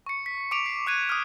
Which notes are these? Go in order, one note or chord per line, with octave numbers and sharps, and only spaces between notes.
C#6 C#7
B6
C#6 D6 D7 F7
C7
D6 F#6 G#6 D#7
D#6 F6